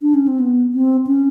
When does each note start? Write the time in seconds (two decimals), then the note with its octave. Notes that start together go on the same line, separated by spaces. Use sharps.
0.02 D4
0.14 C#4
0.28 C4
0.40 B3
0.73 C4
1.07 C#4